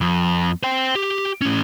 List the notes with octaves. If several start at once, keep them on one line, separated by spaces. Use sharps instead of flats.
F2
C5 G5
G4
A2 C#4